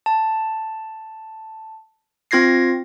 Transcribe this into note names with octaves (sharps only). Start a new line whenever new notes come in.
A5
C4 F4 G#6 A#6 C7